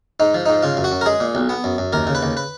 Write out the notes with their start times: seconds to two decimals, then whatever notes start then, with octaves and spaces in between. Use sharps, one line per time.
0.20 G#2 D#4
0.34 F3
0.46 G#2 D#4
0.63 C#3 F4
0.77 F#2
0.84 F#4
0.92 F#2
1.01 A#4
1.06 G#3 G#4
1.20 A#2
1.35 B1
1.49 B3
1.64 F#2
1.78 F#2
1.93 D#2 A#4
2.07 C#3
2.15 B4
2.23 D#2
2.37 B4